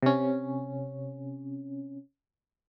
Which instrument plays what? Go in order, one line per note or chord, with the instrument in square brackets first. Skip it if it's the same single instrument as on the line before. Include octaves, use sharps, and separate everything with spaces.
[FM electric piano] C3 C#4